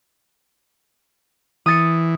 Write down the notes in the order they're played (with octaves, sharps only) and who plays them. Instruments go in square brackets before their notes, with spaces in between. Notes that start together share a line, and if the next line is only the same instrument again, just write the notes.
[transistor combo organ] E3 [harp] D#6 A6 C#7